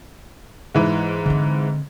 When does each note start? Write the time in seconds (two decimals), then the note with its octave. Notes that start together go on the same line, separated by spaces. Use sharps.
0.75 G#2 E3
1.26 D3 C4